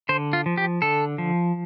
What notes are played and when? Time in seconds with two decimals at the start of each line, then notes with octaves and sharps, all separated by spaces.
0.09 D3 C5
0.33 F4
0.46 F3
0.57 G4
0.82 D3 A4
1.18 F3